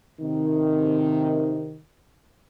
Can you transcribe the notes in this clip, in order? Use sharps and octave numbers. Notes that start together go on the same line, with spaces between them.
C3 D#3